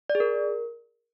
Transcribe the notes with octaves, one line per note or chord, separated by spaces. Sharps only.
D5
G#4
A#4